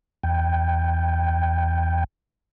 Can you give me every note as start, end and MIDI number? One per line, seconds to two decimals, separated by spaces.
0.23 2.04 40
0.23 2.04 79